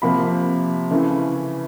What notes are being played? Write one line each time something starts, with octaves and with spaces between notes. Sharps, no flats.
C3 F3 A#3 B5
C#3 E3 A3